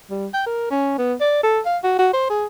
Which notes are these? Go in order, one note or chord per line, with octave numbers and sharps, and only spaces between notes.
G3
G5
A#4
C#4
B3
D5
A4
F5
F#4
F#4
C5
G#4